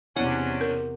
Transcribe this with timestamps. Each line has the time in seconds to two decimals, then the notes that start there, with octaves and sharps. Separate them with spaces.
0.16 E2 C3 C#4 D4 E4 F#5
0.61 A#4